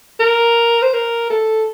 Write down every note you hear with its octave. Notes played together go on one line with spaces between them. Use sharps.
A#4
C5
A#4
A4